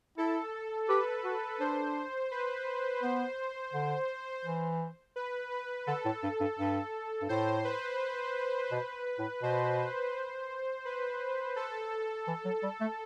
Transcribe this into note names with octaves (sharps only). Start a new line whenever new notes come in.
E4 A4
G4 B4
F#4
D4 C5
B4
B3 C5
D3
E3
B4
B4
D3 A4
A2
G2
G2
G2 A4
G2
A2 C5
B4
B2
A2
B2 C5
B4
A4
E3
F#3
G3
A3